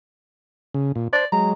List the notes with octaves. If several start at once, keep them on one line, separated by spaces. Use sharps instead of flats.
C#3
A#2
C5 D5
F#3 G#3 A#5